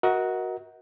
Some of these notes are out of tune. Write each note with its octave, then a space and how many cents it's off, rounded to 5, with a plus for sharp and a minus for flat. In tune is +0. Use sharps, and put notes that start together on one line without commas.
F#4 +0 A#4 +15 D#5 +40